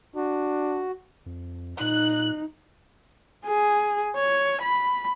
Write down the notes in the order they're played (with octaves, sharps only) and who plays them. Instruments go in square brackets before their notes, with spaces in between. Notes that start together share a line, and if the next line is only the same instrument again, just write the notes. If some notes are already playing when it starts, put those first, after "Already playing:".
[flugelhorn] D4 [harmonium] F#4
[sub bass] F2
[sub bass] A#2 [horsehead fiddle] D#4 [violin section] F#6
[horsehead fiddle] G#4
C#5
B5